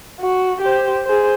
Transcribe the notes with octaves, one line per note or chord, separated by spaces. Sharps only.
F#4
G4 C5
G#4 C5